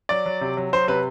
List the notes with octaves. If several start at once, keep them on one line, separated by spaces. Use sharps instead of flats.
F#3 D5
F#3
C3
F#3
F#3 C5
C3 B4